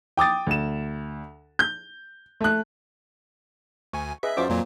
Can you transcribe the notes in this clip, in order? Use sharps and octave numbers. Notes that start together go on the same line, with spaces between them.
G5 D6 D#6 A6
D2 E7
G6
A3 F#6
D2 G#5 C#6
G#4 B4 D#5 E5
F#2 F4 C5 D5 D6
F2 A#2 F#3